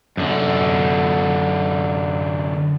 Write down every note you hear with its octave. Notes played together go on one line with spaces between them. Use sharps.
F#2 D3